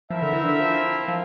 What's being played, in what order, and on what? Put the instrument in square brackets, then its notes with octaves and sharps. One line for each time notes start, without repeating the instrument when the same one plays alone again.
[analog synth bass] F3 [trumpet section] C4 E4 A#4 E5
[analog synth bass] D3
E3
D3
F3
F3